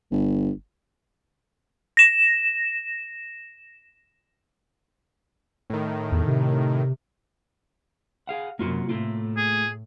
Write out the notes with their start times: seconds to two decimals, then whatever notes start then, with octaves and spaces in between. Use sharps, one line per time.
0.11 G1
1.97 A#6 E7
5.70 A2 D#3
6.12 E2
6.28 C3
8.27 G#4 F5 F#5
8.59 F#2 C3 A#3 F4 F#4
8.89 A2 A3 A#3 F4
9.37 G#4